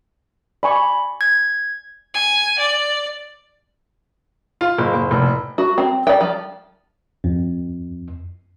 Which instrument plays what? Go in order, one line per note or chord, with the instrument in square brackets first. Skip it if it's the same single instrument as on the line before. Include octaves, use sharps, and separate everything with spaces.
[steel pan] D5 G#5 C#6 [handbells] B5
[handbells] G#6
[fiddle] G#5
D5
[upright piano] F4
F#1
F#1
F1
[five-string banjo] F#4
C4
D5 G5
F3
[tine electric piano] F2